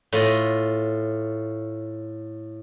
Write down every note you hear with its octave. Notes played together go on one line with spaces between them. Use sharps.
A2 F4 D#5